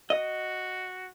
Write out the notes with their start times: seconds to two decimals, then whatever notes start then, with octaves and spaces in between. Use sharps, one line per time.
0.10 F#4 D#5